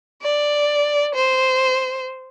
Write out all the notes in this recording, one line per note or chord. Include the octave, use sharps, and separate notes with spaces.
D5
C5